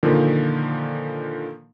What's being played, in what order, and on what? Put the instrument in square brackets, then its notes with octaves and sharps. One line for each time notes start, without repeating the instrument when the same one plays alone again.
[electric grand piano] A#2 D3 D#3 F3